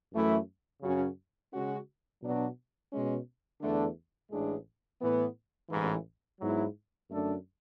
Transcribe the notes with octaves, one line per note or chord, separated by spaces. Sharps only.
F#2 E3 A3 E4
F#2 C#3 F#3 C#4 F#4
C#3 G#3 C#4 F#4
B2 F#3 B3 D4 F#4
B2 G#3 C#4
E2 D3 A3 D4 A4
A1 A2 G#3 D4 G#4
A2 E3 B3
A1 G#2 E3
G#2 F#3 B3 E4
F#2 D3 A3 D4 A4